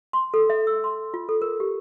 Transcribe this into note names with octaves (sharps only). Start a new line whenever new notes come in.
C6
A4
E5
E6
C6
F4
A4
A#4
G4